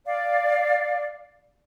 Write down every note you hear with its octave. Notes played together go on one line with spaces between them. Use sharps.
D5 F5